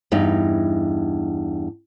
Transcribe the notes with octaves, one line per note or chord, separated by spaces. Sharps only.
E2 G2 D#4